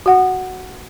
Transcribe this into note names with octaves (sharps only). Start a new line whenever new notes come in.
F#4 F#5